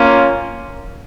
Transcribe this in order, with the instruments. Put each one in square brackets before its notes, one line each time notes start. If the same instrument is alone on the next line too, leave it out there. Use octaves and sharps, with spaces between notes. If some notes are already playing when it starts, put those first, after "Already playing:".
Already playing: [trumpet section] A#3 C#4 F4